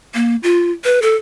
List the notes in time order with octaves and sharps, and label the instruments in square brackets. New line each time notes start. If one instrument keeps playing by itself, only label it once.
[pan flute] A#3
F4
B4
A4